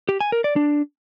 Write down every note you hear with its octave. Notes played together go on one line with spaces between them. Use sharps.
G4
G#5
A#4
D5
D4